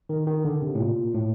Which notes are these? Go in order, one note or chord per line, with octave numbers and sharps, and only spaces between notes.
D#3
D#3
D3
C3
A2
A#2
A2